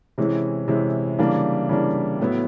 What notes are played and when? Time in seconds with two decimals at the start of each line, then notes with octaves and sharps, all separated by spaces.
0.18 C3 E3 G#3 C#4 E4
0.68 C3 E3 G#3 C#4 E4
1.19 C#3 E3 G3 A#3 D4
1.69 C#3 E3 G3 A#3 D4
2.19 A2 F#3 B3 E4